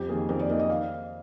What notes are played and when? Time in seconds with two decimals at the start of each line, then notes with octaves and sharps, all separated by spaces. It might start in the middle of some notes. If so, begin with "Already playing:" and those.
Already playing: F2 G4
0.09 D#3 A#3 G#4
0.29 F2 A#4
0.39 D5
0.49 D#3 A#3 D#5
0.59 D#5
0.70 F5